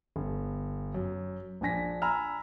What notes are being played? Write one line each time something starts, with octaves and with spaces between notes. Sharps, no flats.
G1
F#2
A#1 D4 G#5 A#6 B6
G#5 A#5 B5 E6 F6